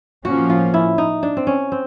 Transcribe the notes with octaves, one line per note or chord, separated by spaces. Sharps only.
A2 F3 A#3 C#4 F#4
F4
E4
D#4
D4
C4
C#4
C4